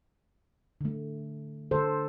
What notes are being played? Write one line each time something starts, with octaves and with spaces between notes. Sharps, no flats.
D3 A3
D3 A3 A4 C5